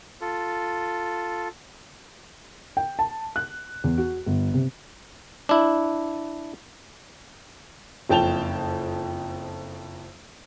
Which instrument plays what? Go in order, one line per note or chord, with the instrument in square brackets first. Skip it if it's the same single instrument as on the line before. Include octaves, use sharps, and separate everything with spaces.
[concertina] F4 A4
[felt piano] G5
A5
F#6
E2
F#4
G1
C3
[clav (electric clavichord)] D4 E4
[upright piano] F#1 F2 G5 A5 F7 G7